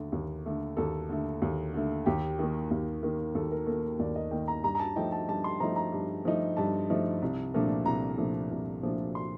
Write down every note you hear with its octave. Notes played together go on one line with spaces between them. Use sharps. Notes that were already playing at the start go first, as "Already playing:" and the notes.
Already playing: D#2 D3 A3
D#2
D3 A3
D#2 A4
D3 A3
D#2
D3 A3
D#2 G4
D#3 A#3
D#2
D#3 A#3
D#2 A4
A#4
D#3 A#3 A4
D#2 D5
D#5
D#3 A#3 G5
A#5
G2 A#5
A#5
A5
F3 A3 D#4 G5
A5
G2 A5
C6
F3 A3 D#4 A#5
A#5
G2
F3 A3 D#4
G2 A5
F3 A3 D#4
C2
A#2 F3 A3 D4
C2 A#5
A#2 F3 A3 D4
C2
A#2 F3 A3 D4
C6